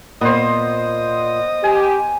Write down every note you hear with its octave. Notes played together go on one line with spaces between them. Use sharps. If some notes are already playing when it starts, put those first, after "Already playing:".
A#2 B3 C5 D#5
G4 G#5